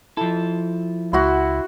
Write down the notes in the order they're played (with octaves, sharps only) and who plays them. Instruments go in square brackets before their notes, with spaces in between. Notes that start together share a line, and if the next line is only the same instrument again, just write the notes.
[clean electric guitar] F3 A4 [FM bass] E4
[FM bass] C#2 [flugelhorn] E4 [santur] F#4 F#5 C6